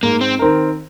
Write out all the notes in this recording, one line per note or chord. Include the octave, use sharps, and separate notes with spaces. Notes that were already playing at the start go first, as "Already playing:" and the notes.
G#2 A#3
C4
D#3 C4 D#4 A#4